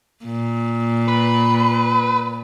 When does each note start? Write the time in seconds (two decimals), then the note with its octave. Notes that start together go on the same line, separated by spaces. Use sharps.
0.24 A#2
1.08 B4